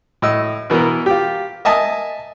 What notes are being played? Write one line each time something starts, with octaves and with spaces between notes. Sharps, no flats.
A2 D#5 E6
B2 E3 B3 A#4
F4 G4
D#5 E5 G#5 A5 D#6